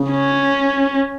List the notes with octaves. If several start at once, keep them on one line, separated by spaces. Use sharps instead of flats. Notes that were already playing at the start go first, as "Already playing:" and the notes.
Already playing: C#3
C#4